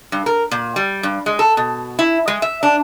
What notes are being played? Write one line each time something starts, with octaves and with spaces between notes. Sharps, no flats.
G2
A#4
A#2
G3
G2
G#3
A4
B2
E4
G#3
E5
D4